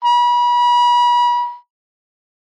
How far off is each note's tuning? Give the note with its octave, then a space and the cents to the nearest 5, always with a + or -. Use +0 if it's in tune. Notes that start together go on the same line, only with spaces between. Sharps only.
B5 -35